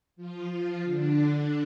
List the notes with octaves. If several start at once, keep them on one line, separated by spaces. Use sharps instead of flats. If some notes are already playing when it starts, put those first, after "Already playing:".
F3 F4
F3 F4
D3 D4